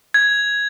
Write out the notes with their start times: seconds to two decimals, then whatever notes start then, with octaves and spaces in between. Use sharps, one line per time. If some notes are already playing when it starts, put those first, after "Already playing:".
0.14 G#6